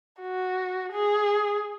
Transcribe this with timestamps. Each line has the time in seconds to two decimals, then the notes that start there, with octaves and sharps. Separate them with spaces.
0.21 F#4
0.93 G#4